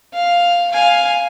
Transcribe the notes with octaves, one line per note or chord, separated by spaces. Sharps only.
F5
F5 G#5